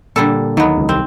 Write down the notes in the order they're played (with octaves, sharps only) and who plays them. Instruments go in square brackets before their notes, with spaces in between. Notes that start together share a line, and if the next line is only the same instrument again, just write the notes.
[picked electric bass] A#2 [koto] D3 G3 A4
[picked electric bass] D#2 [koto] F#3 B3 [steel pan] D#4
[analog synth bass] C#2
[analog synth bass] C2 [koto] C4